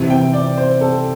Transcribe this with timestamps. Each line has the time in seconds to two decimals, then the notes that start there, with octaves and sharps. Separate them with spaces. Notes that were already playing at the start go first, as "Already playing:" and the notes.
Already playing: C3 E3 C4 E4 G4
0.10 G5
0.33 D5
0.57 C5
0.81 A4